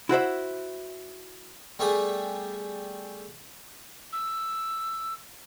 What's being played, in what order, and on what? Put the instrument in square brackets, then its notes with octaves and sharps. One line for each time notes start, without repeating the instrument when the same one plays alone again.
[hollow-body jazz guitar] E4 F#4 C5 E5
[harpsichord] G3 A3 B3 G#4 B5 D6
[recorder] E6